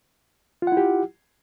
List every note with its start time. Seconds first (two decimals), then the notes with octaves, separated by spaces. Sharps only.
0.62 F4
0.67 F#5
0.72 E4
0.77 G4